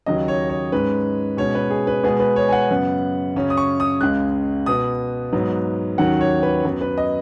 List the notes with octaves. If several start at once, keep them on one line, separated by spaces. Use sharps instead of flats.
D#2 C#3 F#3 D#5
C#5
C#5
G#2 G#3 C#4 B4
B2 G#3 C#4 C#5
B4
G#4
B4
B2 G#3 B3 G#4
B4
C#5
G#5
F#5
F#2 C#3 B3
F#2 C#3 F#3 C#4
D#6
C#6
D#6
C#2 C#3 G#3 F#6
B2 B3 D#6
G#2 F#3 B3
D#2 D#3 F#3 C#4 F#5
C#5
B4
F#2 F#3 B3
B4
D#5